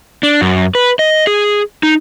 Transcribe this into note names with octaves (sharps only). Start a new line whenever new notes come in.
D4
F#2
B4
D#5
G#4
D#4